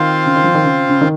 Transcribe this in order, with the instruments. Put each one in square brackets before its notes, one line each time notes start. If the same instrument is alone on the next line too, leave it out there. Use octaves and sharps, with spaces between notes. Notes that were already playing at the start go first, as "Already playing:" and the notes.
Already playing: [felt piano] D#3 [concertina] C4 F4 C5 F5
[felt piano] C#3
D#3
F3
D#3
C#3
C#3
D#3